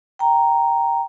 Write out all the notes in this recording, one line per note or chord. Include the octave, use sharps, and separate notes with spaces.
G5 A#5